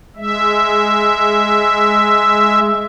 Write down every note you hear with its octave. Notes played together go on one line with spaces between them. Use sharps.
G#3 E5